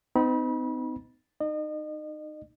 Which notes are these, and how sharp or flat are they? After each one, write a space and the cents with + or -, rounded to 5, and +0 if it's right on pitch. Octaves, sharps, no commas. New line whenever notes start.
C4 -45 D#4 +0 B5 -30
D#4 -20 D#5 -35